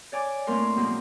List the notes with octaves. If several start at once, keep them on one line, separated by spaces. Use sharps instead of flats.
C#5 D5 G#5 D6
A2 A3 A#3 C4 A#4 C6
F#2 B2 F3 G#3 A#3 C4